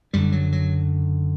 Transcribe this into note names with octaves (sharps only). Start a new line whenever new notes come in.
F#1 F#2 D3 G3
F#3
F#3